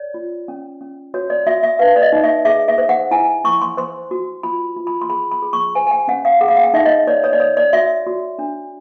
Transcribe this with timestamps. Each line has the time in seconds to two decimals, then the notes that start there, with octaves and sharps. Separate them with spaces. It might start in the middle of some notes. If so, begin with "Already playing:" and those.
Already playing: C#5 D5
0.14 F4
0.48 C#4
0.81 C#4
1.14 F#4 C#5
1.30 D5
1.47 F#4 E5
1.63 E5
1.79 B4 F5
1.96 D5
2.02 D#5
2.13 D#4
2.24 E5
2.45 G#4 E5
2.68 E5
2.78 C5
2.89 F#5
3.11 E4 G#5
3.44 E4 C#6
3.62 C6
3.77 C5 C6
4.11 F#4
4.43 F4 B5
4.77 F4
4.87 B5
5.02 C6
5.09 G#4 B5
5.31 B5
5.42 G#4
5.53 C#6
5.75 C5 G#5
5.87 G#5
5.91 G5
6.08 C#4 F#5
6.25 F5
6.41 G#4 F#5
6.48 F5
6.56 F#5
6.63 G5
6.74 D#4 E5
6.85 D#5
7.07 C#5 D5
7.24 C#5
7.33 D5
7.40 C#5
7.57 D5
7.73 F#4 E5
8.07 F#4
8.39 D4